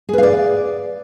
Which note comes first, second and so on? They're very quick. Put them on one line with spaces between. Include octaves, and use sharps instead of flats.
G#4 B4 F5 D5